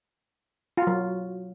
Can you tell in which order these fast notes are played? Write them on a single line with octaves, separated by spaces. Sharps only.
F4 F#4 F#3